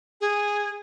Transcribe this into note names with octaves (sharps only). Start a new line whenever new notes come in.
G#4